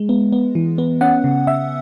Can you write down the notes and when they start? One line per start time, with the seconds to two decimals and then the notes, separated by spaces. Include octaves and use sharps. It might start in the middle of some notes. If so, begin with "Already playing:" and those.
Already playing: G#3
0.09 B3
0.32 B3
0.55 E3
0.78 B3
1.01 C#4 F#5
1.24 C#3
1.47 C#3 E5